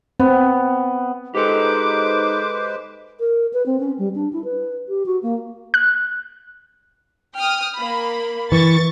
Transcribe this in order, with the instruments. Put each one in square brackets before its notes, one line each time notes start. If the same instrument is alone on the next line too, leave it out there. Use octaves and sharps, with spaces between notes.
[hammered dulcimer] B3 [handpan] C4
[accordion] G#3 B4 C5 [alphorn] D#4 [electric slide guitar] G4 A4 [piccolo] D6
[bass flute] A#4
B4
C4
C#4
G3
D4
E4
B4
G4
F#4
A#3
[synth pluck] F#6
[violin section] G5 D#6 F6
A#3 B5
[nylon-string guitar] E3 [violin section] C#6 A6